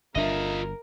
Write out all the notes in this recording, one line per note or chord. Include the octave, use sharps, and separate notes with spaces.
G1 D4 F4 A#4 D#5 E5